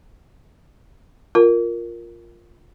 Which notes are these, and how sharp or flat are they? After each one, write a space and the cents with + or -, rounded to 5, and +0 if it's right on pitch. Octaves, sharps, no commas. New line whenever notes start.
F4 +0 A#4 +0